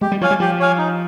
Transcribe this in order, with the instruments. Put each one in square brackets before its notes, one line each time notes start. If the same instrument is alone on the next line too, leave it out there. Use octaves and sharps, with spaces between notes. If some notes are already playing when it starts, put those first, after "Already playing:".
[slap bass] G#3 [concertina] G4
[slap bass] G3
[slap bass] F3 [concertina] C#5 F5 G#5
[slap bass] G3
[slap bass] F3 [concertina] G4
[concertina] C#5 F5 G#5
D#4